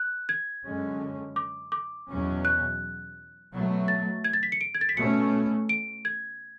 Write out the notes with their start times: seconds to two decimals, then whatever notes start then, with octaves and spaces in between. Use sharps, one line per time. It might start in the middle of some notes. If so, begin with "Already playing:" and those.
Already playing: F#6
0.29 G#6
0.64 F#2 D3 G#3 C#4
1.36 D6
1.72 D6
2.08 E2 B2 F#3 C#4
2.45 F#6
3.53 B2 F#3 A3
3.88 A6
4.24 G#6
4.33 A6
4.43 B6
4.52 C#7
4.61 D7
4.75 G#6
4.81 A6
4.89 B6
4.96 B2 A3 C#4 C#7
5.69 D7
6.05 G#6